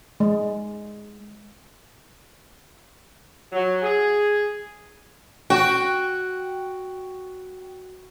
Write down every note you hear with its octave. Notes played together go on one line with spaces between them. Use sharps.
G#3
F#3
G#4
F#4 G5